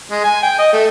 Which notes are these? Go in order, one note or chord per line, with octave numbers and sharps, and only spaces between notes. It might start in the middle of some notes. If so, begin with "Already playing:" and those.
G#3
G#5
G5
D#5
A3